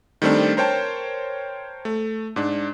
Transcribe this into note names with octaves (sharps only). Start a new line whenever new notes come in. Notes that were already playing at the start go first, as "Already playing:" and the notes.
D#3 G3 A3 C4 D4
A#4 C5 C#5 G5 A5
A3
G#2 D4